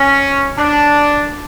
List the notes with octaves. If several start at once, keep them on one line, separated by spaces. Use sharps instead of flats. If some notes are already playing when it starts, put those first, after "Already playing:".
Already playing: C#4
D4